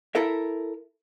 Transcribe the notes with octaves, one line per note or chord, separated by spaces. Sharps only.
E4 A4 A#4 E5